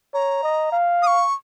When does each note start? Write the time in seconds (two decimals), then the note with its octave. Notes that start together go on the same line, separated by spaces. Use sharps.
0.14 C#5 A#5
0.43 D#5
0.72 F5
1.02 D#6
1.07 C#6